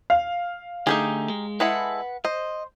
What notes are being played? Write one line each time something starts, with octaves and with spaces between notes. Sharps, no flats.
F5
D3 A3 D#4 G4 G#4
G#3
G#3 E4 A4 B4 F#5
C5 D#5